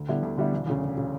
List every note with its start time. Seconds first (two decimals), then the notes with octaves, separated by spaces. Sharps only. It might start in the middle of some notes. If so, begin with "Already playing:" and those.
Already playing: D2
0.08 D3 G3 B3 E4
0.23 D2
0.37 D3 G3 B3 E4
0.53 E1
0.67 D2 C#3
0.82 E1
0.98 C#3